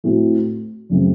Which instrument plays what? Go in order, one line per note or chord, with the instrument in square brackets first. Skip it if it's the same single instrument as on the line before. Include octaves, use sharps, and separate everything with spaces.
[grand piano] A2 A3 C4 F#4
F#2 C#3 A3 C4